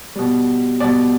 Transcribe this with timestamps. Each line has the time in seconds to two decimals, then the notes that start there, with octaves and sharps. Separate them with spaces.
0.16 B2 G3
0.80 B2 G3 D5